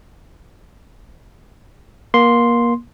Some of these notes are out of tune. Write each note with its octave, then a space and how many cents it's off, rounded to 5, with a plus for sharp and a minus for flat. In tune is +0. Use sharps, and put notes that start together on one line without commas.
A#3 +25 C6 +0